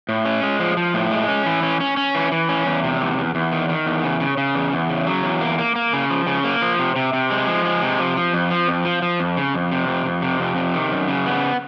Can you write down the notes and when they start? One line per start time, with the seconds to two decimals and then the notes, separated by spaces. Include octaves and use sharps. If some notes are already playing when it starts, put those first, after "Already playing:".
0.09 A2
0.25 C#4
0.43 G#3
0.60 F3
0.77 F3
0.94 A2
1.11 G#3
1.28 C#4
1.46 E3
1.63 C#4
1.80 C#4
1.97 C#4
2.15 E3
2.32 E3
2.49 C#4
2.66 E2
2.84 C3
3.01 E2
3.18 E2
3.35 E2
3.52 D#3
3.69 D#3
3.86 E2
4.03 C#3
4.20 C#3
4.37 C#3
4.55 E2
4.73 E2
4.90 C#3
5.07 F#3
5.24 E2
5.41 A#3
5.58 A#3
5.76 A#3
5.93 C#3
6.10 F3
6.27 C#3
6.44 A#3
6.62 F3
6.79 C3
6.96 C3
7.13 C3
7.30 G#3
7.47 F3
7.65 G#3
7.82 C3
8.00 F3
8.17 F3
8.33 F2
8.51 F3
8.68 F2
8.85 F3
9.02 F3
9.20 F2
9.37 C#3
9.54 F2
9.72 C3
9.88 F2
10.05 F2
10.22 C3
10.40 F2
10.56 C3
10.74 D#3
10.92 F#2
11.08 C#3
11.26 B3